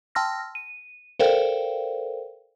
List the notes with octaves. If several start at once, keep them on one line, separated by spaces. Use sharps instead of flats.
G5 A5 C6 E6 F6 A#6
D#7
A4 A#4 C5 D5 F5 G5